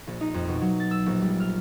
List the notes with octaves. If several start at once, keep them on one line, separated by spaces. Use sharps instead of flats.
A#1
D#4
F2
B2
F#3
A6
E6
A#1
G3
F6